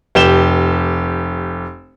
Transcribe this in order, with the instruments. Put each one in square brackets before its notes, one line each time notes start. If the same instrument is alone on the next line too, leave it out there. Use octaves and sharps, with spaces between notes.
[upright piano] F1 G4 E7 G7